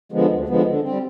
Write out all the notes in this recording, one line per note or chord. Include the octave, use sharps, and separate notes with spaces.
D3 F3 G#3 B3
D2
D3 F3 G#3 B3
D3
G3 C4